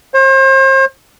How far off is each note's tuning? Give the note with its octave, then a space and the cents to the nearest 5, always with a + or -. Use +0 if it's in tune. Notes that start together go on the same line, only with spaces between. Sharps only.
C5 +40